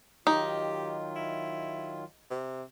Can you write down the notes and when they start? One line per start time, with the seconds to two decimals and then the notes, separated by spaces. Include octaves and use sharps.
0.27 D#3 F#3 D#4 F4 G4
1.16 E4
2.31 C3